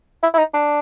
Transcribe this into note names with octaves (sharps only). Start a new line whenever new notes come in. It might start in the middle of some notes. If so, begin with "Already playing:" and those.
E4
E4
D#4
D4